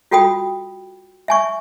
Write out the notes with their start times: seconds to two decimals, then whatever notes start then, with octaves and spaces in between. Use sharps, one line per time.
0.11 F4 F#4 A4 G5 B5 D#6
1.28 E5 G#5 C#6